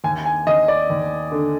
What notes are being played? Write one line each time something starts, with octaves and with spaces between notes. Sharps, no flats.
D#2 G#5
G#5
D#2 D#5
D5
D#2
D3